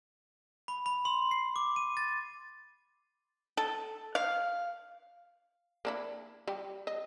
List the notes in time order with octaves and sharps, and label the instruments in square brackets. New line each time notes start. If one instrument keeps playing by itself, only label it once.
[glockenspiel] B5
B5
C6
C7
D6
D#7
A6
[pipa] A4
F5
[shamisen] A#3 D4 E4
G3 G4
D#5